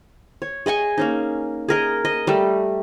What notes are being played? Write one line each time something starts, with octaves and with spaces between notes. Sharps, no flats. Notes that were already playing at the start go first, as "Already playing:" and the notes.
C#5
G#4 D#5 G#5 C#6
A#3 C#4 D#4
G#4 A#4 D#5
D#5
G3 A3